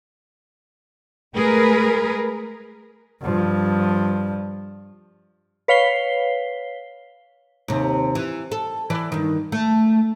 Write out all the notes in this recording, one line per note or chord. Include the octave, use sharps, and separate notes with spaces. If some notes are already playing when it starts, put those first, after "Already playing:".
G#3 A3 G#4 A#4 B4
G2 F3
B4 C#5 F5 B6 C7 G7
D#2 C3
E3
A4
E3 B4 D5
G2 D#3
A3